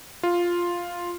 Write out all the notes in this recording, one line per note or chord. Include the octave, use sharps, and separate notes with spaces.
F4